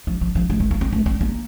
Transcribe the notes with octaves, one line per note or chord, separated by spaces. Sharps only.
F3
F3
F3
A3
A3
A#3
C4
A3
C4
A#3